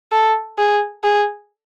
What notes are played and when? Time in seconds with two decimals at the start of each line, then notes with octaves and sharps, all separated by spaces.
0.12 A4
0.58 G#4
1.04 G#4